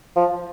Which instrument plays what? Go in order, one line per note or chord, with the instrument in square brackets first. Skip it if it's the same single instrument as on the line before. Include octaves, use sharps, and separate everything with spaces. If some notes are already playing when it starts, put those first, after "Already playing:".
[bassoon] F3